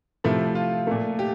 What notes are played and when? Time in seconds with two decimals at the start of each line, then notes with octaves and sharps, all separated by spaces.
0.24 C3 F3 A3 E4
0.55 F4
0.87 A#2 A3
1.19 G4